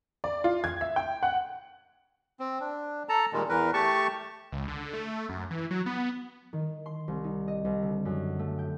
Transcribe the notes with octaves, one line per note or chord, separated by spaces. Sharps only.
D5
F4
G#6
E5
G5
F#5
C4
D4
A4 A5 A#5
A#2 D#3 G3 G#3
E2 E3 A#4 B4
A3 G4 A5 C#6
C#2
D3
A3
F#2
E3
F#3
B3
D#3
C6
C2
D#4
D#5
C2
D3
F#2
A3
G5